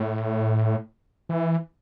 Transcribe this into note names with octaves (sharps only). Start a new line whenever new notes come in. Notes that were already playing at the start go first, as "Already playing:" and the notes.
Already playing: A2
E3